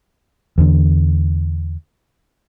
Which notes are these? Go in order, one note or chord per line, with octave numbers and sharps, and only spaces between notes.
E2 D3